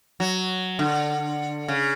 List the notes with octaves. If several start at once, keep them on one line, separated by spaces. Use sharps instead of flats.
F#3
D3
C#3